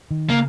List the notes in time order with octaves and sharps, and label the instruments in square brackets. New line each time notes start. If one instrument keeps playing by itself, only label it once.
[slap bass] D#3
[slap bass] C#3 [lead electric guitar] A#3